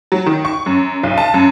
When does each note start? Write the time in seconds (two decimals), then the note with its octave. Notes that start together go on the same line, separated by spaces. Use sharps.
0.12 F#3
0.26 D#3
0.45 C#6
0.66 F#2
1.03 B1
1.18 A5
1.34 F#2